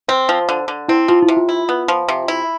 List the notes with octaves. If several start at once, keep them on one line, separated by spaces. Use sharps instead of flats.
C4 C5
F3
D3
D3
C4 E4
F3 F4
E4
C3
F4
E4
B3
F3
C3
E4